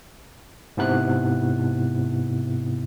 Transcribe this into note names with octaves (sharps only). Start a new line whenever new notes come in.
G#2 C3 B3 E4 F#6